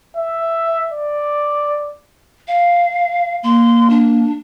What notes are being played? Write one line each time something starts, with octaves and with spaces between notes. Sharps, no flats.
E5
D5
F5
A#3 C6
D4